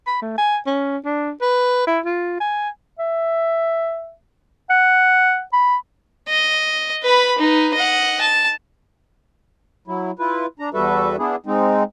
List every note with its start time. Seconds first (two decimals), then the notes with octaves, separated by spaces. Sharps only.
0.07 B5
0.22 A3
0.38 G#5
0.66 C#4
1.04 D4
1.41 B4
1.87 E4
2.05 F4
2.40 G#5
2.99 E5
4.70 F#5
5.53 B5
6.29 D#5
7.04 B4 B5
7.39 D#4 B4
7.75 D#5 F#5
8.21 A5
9.87 F#3 E4
10.19 E4 F4 B4
10.59 D4 A#5
10.74 E2 G3 F#4 A4 B4 E5
11.19 B3 D4 E4 G#4
11.46 G#3 C4 D#4